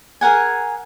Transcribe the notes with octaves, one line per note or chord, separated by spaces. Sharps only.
G#4 A#4 F#5 G#5